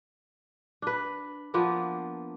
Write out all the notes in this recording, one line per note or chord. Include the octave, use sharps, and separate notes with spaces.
D4 B4
F3 A#3 B3 D4